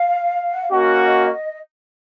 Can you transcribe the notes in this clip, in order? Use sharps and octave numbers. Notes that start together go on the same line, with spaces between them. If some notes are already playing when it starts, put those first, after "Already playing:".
Already playing: F5
F#5
F5
A#3 C#4 F#4 D#5